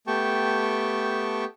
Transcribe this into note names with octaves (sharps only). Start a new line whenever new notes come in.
A3 B3 G4 G5 A5 C#6